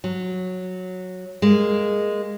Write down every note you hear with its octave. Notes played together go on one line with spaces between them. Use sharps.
F#3
G#3 A#3